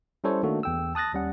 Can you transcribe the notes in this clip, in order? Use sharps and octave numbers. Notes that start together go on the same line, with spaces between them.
G3 C#4 E4 A4 C5 C#5
D#3 A3 A#3 D4 F#4 A4
E2 G5 E6
A5 D#6 F#6 A6 A#6
D#2 G3 C#4 F#5